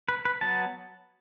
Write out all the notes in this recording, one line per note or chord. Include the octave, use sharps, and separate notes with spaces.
B4
B4
F#3 B3 A5